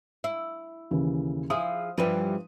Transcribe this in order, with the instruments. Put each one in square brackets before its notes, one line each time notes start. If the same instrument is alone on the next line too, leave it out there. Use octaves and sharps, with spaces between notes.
[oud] E4
[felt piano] D#2 C#3 E3
[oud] F3 E4 G#4 [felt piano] D#6
[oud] G2 E3 G3 [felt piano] F3 B4 D#7